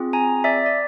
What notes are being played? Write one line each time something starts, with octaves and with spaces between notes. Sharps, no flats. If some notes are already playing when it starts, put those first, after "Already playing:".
Already playing: C4 F4 G#4
G#5 A#5
D5 E5
D5